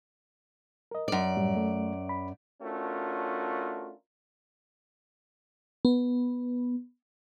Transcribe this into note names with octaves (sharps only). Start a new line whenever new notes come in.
A#4 D#5
F#2 D5
A2 G3
A3
B5
A3 C#4 D4 F4 F#4 A#4
B3